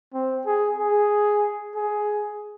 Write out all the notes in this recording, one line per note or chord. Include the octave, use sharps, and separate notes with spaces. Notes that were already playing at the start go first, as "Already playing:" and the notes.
C4
G#4
G#4
G#4